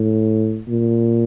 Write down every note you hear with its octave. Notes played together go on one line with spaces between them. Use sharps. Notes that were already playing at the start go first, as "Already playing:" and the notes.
Already playing: A2
A#2